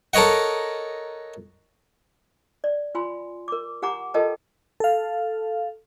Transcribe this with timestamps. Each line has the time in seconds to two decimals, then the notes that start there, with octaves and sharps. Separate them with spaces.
0.13 A4 A#4 C#5 D#5 F#5
2.64 D5
2.95 F4 G#5 B5 C6
3.48 A#4 D6
3.82 G4 F#5 G#5 A#5 D6
4.14 F4 A4 A#4 D#5 G5 A5
4.80 A4 F5